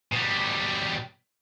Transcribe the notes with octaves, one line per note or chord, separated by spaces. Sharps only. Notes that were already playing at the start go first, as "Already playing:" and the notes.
B2 G3